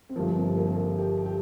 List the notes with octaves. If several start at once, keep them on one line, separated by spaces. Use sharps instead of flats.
C4
G1 G2 F3 A#3
C4
A#3
A#3
G4
G4